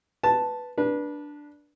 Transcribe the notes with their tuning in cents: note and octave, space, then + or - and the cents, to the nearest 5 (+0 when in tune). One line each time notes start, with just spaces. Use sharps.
B4 +0 A5 +0
D4 +0 B4 -30